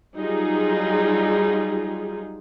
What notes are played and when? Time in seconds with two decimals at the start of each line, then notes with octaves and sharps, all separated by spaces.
0.16 F#3 G3 D#4 F4 G#4